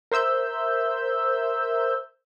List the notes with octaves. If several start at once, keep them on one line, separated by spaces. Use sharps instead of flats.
A#4 C5 E5 E6 G6